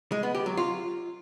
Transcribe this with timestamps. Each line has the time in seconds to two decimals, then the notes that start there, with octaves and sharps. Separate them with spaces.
0.12 G#3
0.23 B3
0.35 G4
0.46 F#3
0.57 F4